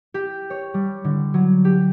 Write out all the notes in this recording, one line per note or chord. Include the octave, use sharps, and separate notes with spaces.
G4
C#5
G3
D3
F#3
G4